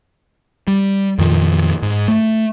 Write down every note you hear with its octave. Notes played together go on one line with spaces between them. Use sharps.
G3
F2 A#2 D#3 F3
G#2
A3